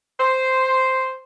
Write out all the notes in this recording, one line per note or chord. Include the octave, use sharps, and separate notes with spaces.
C5